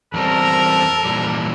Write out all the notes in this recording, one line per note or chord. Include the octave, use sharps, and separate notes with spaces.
E2 G3 C4 A4 A#4
A#2 E3 G3